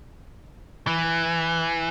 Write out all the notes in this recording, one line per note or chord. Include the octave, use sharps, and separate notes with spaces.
E3